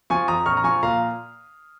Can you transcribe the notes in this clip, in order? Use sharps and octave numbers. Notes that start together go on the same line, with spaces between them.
F3 G#5 C#6
F2 A#5 D#6
A#1 C#6 F6
A#5
F3 G#5 C#6
A#2 F5 A#5